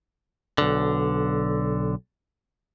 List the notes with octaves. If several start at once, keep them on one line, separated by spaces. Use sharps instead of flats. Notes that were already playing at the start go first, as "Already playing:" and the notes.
B1 D3